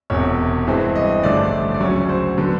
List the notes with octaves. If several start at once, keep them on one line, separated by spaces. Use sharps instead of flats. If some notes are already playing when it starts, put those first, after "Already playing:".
E1 E2 C3 C#5
G2 E3 G#3 C4
D#5
A1 G2 D3 F3 A3 D5
D5
D2 C#3 F#3 C#5
C5
D3 F#3 B3